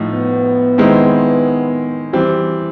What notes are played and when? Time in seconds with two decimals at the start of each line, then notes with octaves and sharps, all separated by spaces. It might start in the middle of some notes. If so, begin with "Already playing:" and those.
Already playing: A2 F3 D#4
0.11 B3
0.78 D#3 G#3 C4 E4
2.13 E3 G3 C4